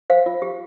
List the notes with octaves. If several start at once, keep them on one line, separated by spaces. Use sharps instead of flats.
C5 F5
F4
G4